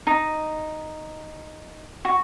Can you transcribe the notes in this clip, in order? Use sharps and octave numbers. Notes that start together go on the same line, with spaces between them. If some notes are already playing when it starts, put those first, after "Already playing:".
D#4
F#4